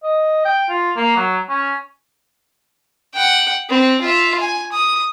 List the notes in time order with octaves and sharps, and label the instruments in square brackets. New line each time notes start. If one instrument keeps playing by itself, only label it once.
[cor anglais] D#5
G5
F4
A#3
F#3
C#4
[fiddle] F#5 G5
C4
F4 E5
G#5
D#6